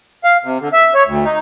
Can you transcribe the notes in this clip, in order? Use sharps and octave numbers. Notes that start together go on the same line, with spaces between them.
F5
C3
D3
E5
C#5
D2
D#4